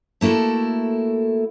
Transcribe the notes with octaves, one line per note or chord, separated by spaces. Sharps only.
A3 A#3 E4 F#4 A4